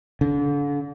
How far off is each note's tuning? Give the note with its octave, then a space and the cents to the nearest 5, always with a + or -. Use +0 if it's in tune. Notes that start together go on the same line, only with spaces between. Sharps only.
D3 -35